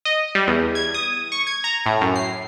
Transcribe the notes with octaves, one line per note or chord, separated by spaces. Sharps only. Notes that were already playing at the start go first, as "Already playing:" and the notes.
D#5
G3
E2
G#6
D#6
C#6
G#6
A#5
A2
F#2
C7